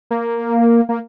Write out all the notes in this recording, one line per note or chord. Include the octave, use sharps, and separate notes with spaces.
A#3
A#3